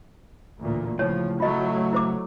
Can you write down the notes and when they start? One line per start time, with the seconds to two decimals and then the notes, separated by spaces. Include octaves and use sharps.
0.60 A1 D2 A#2
0.99 A2 C#3 F3 C#5
1.40 F#3 A3 F4 D#5
1.93 E4 C5 D6